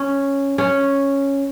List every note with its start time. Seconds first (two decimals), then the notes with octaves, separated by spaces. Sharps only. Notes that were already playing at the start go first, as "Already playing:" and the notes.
Already playing: C#4
0.58 C#4